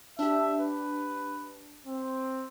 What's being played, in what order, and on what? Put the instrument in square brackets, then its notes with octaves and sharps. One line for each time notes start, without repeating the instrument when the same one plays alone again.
[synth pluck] D4 G4 [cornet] E5
[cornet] B4
C4